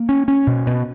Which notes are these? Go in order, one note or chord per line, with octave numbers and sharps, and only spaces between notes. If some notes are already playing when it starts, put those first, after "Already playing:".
Already playing: A#3
C#4
C#4
B2
B2